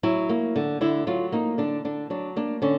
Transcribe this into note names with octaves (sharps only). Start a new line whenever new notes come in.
F#3 E4
A#3
D3
D3 E4
F#3 F4
A#3 D#4
D3 D4
D3 D4
F#3 D4
A#3 D4
D3 C#4